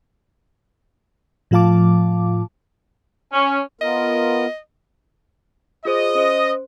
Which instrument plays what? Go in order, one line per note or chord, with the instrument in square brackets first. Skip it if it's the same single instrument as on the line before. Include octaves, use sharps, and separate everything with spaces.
[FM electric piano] A2 F3 F4 F5 A5 D6
[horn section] C#4
[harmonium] B3 F4 A#4 [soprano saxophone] D#5
[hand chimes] F4 G#4 C5 [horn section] D#5
[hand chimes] C#4 C5